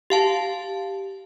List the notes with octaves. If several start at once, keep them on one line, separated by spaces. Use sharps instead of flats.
G4 F5 A5